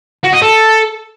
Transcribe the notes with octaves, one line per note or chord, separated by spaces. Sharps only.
F#4
D#5
A4